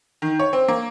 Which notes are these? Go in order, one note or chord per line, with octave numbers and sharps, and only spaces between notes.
D#3
C#5
C4
A#3